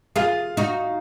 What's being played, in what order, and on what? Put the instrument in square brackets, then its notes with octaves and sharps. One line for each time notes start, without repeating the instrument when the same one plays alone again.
[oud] F4 G#4 [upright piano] F5
[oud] D#4 F#4